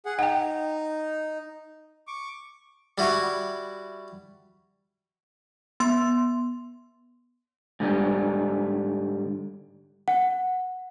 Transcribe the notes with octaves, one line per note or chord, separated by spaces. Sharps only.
G#4 F#5
D#4 F#5 G5
C#6 D6
G3 E4 F#4
B3 C6
G#2 D3 G3
F#5